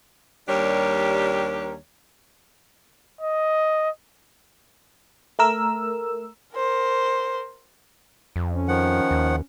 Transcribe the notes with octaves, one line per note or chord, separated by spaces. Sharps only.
D#2 G3 D4 G4 A#4 C#5
D#5
A3 A#4 E6
A#4 C5
F2
C#4
D#3 F3 F#5
D#2